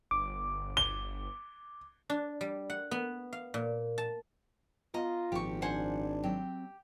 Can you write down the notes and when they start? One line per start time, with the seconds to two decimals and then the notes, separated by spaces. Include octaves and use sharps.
0.11 G1 D6
0.77 G7
2.10 D4
2.41 G3
2.70 F#5
2.91 B3
3.33 F5
3.54 A#2
3.98 A5
4.94 B3 F4 D#5 A#5
5.32 G#1 A#2 F3 G4 C#6
5.62 D4 C5 F#5 G#5
6.23 F#3 C4 G4 G5